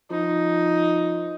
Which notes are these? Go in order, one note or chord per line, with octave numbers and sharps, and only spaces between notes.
F3 D#4